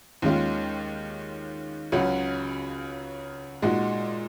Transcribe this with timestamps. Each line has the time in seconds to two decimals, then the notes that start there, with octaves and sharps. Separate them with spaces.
0.22 D#2 D#3 G#3 C#4 F4
1.92 C#2 C#3 F#3 C#4 F#4
3.62 A#2 G#3 D#4 F#4